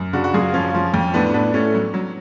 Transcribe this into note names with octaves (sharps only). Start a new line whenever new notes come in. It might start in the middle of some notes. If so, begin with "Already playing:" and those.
Already playing: F#2
C#3 D4 F#4
F#4
F#2 F4 G#4
F3 C#4 F4
F3
F2
A2 B3 D4
A2 B3 D4
A2 A3 C#4
F#3
F#3